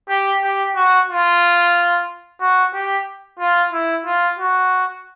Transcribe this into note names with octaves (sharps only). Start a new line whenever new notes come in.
G4
G4
F#4
F4
F#4
G4
F4
E4
F4
F#4